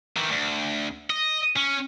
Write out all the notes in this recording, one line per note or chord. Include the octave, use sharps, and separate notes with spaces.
D#3 E3
D2
D#5
C#4